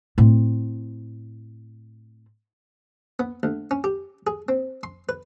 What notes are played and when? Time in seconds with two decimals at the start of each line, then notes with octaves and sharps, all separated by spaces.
0.18 A2 C4
3.19 B3
3.43 D2
3.71 C#4
3.84 G4
4.27 G#4
4.48 C4
4.83 C6
5.09 B4